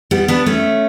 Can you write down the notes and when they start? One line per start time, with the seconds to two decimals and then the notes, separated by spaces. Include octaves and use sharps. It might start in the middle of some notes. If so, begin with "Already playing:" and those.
0.11 G3 B3
0.28 B3 D4
0.46 A3 C#4